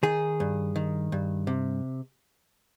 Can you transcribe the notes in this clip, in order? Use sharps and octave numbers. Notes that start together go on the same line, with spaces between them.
D#3 G#4
G2
D#3
G2
C3